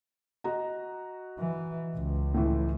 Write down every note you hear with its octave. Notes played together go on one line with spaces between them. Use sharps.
F#4 D#5 A#5
E3
C#2
A2 E3